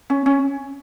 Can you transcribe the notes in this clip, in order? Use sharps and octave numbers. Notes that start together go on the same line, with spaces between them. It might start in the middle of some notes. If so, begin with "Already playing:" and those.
C#4
C#4